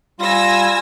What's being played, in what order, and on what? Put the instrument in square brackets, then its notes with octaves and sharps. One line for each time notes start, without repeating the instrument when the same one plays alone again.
[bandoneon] G3 F4 [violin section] G#5 E6 A#6